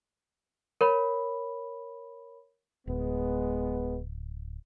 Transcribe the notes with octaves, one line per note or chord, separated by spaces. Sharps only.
A#4 C#5 B5
D1 G#3 B3